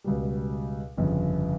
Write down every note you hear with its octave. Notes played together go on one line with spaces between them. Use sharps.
C#2 B2 G3
G1 F2 C#3